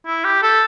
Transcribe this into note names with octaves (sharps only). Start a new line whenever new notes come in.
E4
G4
A4